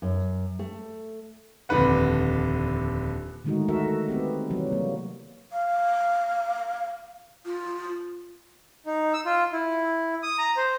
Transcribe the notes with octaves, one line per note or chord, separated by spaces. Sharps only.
F#2
A3
D#1 F2 D3 D4 B4 F#5
D3 D#3 G#3 A3 D#4 F#4
F#4 A4 A#4 E5
B3 C4 G4
C3 E3 F#3 G3
A#3
F5
F4
D#4
E6
F4
E4
D#6
A#5
C5